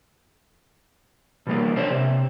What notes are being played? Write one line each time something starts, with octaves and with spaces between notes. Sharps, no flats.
B2 G3 A#3
D4 C5 C#5
C3